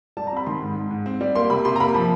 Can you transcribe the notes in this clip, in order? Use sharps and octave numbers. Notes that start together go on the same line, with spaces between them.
G3 A5
A#5
C4 B5
D#3 C6
G#2
G#2
G#2
C4
G3
A#3 C6
C3 B5
C3 C6
A#5
A#3 B5
F3